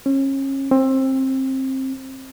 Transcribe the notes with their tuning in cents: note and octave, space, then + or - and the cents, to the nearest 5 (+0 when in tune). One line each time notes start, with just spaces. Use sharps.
C#4 -30
C4 +20